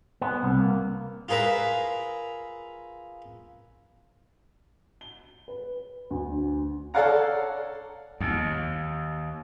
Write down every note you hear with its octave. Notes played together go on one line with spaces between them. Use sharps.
B3
C2
A#3
F4 G#4 A#4 B4 E5
G7
B4
D2
A4 C#5 D5 F5 F#5 A#5
D#2